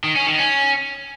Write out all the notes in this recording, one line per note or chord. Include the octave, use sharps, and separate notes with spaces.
D#3
C#4
D#3
C#4